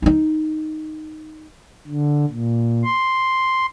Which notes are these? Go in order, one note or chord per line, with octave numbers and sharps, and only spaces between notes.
D#4 E4
D3
A#2
C6